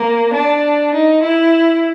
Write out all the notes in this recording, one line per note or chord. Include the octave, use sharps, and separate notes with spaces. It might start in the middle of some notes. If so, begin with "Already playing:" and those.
Already playing: A#3
D4
D#4
E4